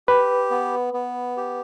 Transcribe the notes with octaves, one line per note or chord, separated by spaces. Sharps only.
G4 B4
B3
B3
G4